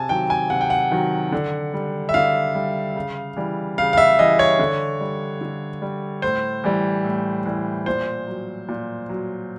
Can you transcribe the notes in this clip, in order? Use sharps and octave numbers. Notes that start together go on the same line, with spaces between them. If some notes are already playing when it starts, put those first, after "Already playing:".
Already playing: C3 G#5 A5
D#3 F#3 G5
G#5
C3 F#5
G5
F#5
D#3 F#3
D3
G3
E5
D3 F5
G3
C#3
E3 G3
C#3 F5
F5
E5
E3 G3 D#5
C#5
D3
G3
D3
G3
A2 C5
E3 G3
A2
E3 G3
A#2 C5
F#3
A#2
F#3